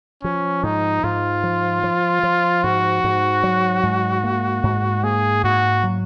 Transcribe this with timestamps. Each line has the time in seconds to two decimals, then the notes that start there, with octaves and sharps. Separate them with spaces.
0.23 F3 C#4
0.63 G#2 D#4
1.04 G#2 F4
1.43 F3
1.83 F3
2.23 F3
2.64 G#2 F#4
3.04 G#2
3.43 F#3
3.83 G#2
4.24 A#3
4.63 G#2
5.03 A#3 G#4
5.43 G#2 F#4
5.83 F#3